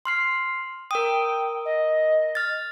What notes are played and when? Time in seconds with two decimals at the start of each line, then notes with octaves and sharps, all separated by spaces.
0.05 C6 F6 C7
0.91 A#4 G5 D#6
1.65 D#5
2.35 F6 A6